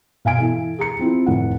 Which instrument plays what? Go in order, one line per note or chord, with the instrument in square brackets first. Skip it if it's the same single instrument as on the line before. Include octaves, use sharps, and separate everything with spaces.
[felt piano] B2 F5 G#5 D7
E3 A4
G#4 A#5 C#7
F3 C4 E4 F4
F1 A2 F#5